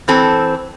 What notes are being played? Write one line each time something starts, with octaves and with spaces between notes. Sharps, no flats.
E3 C4 A4